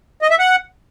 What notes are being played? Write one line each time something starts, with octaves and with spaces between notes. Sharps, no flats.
D#5
E5
F#5